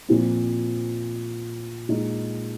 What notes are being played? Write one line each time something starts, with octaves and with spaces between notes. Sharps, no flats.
A#2 F3 C4
A#2 G#3 D#4